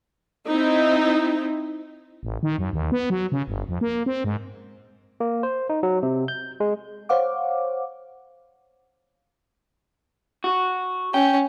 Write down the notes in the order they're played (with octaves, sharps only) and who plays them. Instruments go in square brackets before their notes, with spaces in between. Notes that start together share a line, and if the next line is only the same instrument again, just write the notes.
[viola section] C4 D#4 E4
[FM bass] A1
D#3
F#2
D#2
B3
F#3
C#3
G1
F2
A#3
C4
G#2
[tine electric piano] A#3
C5
D#4
F#3
C3
G6
G#3
[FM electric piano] C5 C#5 F5 F#5 D6
[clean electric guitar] F#4
[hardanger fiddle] C#4 [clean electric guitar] G5